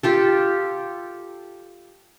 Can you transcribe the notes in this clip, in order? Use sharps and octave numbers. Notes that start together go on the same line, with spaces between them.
F4 G4 A4